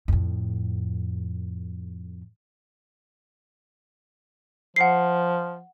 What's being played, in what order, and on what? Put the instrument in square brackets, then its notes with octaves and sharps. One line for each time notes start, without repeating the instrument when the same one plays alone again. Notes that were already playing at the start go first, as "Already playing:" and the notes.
[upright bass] F2 A2
[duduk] F3 [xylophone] F#5 C7